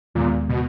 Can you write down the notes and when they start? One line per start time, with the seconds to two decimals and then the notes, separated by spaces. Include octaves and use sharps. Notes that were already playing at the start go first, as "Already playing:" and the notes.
0.15 D#2 A#2 D#3 G#3 B3
0.49 B2